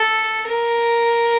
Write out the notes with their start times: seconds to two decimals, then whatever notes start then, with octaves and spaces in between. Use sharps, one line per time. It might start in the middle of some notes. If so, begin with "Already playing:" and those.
Already playing: A4
0.47 A#4